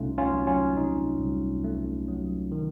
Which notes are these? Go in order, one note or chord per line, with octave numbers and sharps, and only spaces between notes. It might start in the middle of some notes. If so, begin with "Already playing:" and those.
Already playing: C2 C3 A3 C#4 D#4 F4
C#4 F4
F#3
C#4 F4
C3 D#4
C2
A3
F#3
D#3